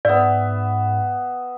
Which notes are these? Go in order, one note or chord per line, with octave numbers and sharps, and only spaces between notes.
G#2 B3 D5 E5